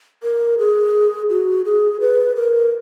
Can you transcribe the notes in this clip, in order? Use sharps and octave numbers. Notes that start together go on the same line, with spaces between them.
A#4
G#4
F#4
G#4
B4
A#4